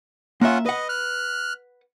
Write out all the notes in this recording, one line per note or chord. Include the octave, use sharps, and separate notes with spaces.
A#3 C#4 F4 E5 F#5
B4 D#5 F#5
F6 F#6